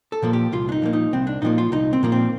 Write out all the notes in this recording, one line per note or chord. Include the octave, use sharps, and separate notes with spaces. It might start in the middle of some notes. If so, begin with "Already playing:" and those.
A4
A#2 F3 A#3
G4
C2 F4
D4
D#4
A#2 F3 A#3
D#4
C2 C4
D4
A#2 F3 A#3 D#4
F4
C2 D#4
C4
A#2 F3 A#3
C4